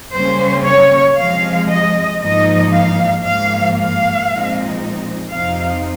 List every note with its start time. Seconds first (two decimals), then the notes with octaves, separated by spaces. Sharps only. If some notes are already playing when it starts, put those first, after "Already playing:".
0.14 C#3 G3 A#3 C#4 C5
0.66 C#5
1.18 C3 F3 G#3 F5
1.69 D#5
2.22 G#2 F3 A#3 D#4 D#5
2.74 F5
3.26 G#2 F3 A#3 F5
3.77 F5
4.30 A#2 F3 G#3 C4 D#4
5.33 F2 C3 F3 C4 D#4 F5